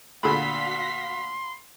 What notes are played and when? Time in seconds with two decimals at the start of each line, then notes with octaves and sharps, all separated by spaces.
0.23 D2 A#2 D3 F#4 F5 B5 C6 B6